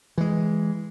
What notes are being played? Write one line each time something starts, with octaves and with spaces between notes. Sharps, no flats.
E3 G#3